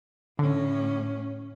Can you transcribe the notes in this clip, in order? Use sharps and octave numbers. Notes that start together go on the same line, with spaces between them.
A2 D3 C#4